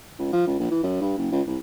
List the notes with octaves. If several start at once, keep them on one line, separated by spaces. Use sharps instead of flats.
C#2
F3
C#2
A#1
E3
F#2
G2
F#1
C#2
C2